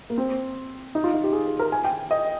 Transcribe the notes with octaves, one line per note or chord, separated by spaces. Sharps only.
A#3
C4
D#4
F4
D#4
G4
G#4
G#4
A#4
G#5
G5
D#5